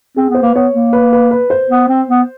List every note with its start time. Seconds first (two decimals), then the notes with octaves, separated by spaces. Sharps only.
0.16 C4 G#4
0.30 B3
0.35 C5
0.42 A#3 B4
0.55 B3 C#5
0.74 A#3
0.93 B4
1.13 B4
1.31 B4
1.50 C5
1.70 B3
1.89 C4
2.09 B3